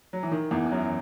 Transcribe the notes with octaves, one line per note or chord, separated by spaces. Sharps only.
F#3
E3
D#3
E2 E3
E3
F#2 F#3